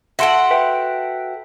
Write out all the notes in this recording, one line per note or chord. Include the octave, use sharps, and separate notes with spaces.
F#4 A4 E5 F#5 C6 D7
B4 E5 G5